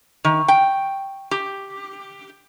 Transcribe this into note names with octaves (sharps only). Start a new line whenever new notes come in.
D#3
G5
G4